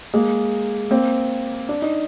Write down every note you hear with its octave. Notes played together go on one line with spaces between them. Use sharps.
G#3 A#3
A#3 C4
D4
D#4